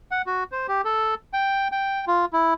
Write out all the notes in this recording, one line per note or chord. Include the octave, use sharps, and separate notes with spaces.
F#5
F#4
C5
G4
A4
G5
G5
F4
E4